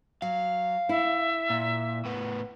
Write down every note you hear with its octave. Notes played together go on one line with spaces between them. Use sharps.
F#3 F5
E4 E5
A#2
A2 B3